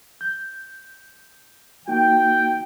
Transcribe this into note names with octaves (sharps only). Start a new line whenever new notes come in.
G6
A#3 D#4 F#4 G5